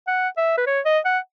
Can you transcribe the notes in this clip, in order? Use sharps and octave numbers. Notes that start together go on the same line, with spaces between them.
F#5
E5
B4
C#5
D#5
F#5